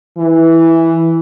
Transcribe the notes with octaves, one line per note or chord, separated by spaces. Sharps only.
E3